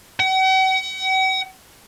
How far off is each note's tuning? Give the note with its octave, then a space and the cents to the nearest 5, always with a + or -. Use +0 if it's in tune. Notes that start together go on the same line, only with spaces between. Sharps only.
F#5 +45